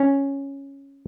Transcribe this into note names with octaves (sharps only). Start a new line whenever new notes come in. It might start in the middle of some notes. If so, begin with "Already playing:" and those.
Already playing: C#4